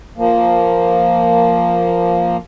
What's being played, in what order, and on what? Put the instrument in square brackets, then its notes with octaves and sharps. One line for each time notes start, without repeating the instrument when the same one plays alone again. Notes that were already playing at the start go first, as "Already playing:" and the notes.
[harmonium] F3 A#3